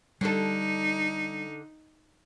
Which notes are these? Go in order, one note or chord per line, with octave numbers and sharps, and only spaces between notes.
D3 G3 D#4 A4